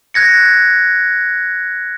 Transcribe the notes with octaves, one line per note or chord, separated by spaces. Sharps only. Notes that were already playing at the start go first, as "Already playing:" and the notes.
F#6 G#6 A#6 C#7